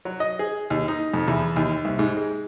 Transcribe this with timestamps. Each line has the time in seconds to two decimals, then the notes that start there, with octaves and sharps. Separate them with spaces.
0.05 F#3
0.20 D#5
0.39 G#4
0.70 D#2
0.88 D#4
1.14 F2
1.28 E2
1.56 D#2
1.85 C2
1.99 G#2
2.17 G#3